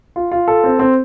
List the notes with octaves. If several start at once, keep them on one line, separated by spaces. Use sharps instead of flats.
F4
F4
A4
C4
C4